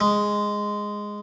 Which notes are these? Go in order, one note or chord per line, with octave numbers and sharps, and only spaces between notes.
G#3